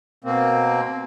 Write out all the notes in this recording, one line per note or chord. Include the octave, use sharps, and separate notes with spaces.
B2 A#3 C4